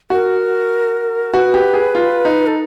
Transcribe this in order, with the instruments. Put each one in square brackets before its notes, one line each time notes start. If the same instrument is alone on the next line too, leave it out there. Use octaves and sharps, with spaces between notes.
[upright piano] F#4 [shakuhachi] A#4
[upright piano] F#4 [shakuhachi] B4
[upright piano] G4
G#4
F4
D#4
[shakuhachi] A4